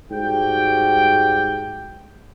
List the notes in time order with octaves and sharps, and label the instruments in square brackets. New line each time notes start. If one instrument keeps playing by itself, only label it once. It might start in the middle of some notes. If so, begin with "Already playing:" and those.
[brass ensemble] G#2 G3 F#4 G5